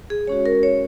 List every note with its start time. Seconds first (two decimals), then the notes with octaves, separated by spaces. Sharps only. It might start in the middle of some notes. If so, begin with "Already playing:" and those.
0.10 G#4
0.27 G#3 C#4 F#4 C#5
0.46 A#4
0.63 C#5